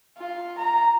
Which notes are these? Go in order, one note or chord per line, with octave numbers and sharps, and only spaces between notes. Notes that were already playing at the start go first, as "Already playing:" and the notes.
F4
A#5